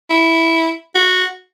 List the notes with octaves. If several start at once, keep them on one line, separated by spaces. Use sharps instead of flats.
E4
F#4